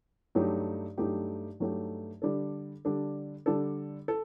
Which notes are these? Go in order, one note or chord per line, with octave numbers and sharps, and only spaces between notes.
G2 F#3 A3 D#4 G4
G2 F#3 A3 D#4 G4
G2 F#3 A3 D#4 G4
D3 G3 D4 A4
D3 G3 D4 A4
D3 G3 D4 A4
A4